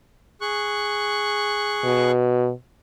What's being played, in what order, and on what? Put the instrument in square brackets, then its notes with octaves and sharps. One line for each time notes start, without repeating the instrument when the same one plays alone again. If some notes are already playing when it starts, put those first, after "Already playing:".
[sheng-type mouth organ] G#4 C#6 F#6
[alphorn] B2